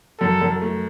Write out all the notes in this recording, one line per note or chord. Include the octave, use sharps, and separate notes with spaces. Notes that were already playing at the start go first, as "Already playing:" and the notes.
F#2 A4
F#2
A3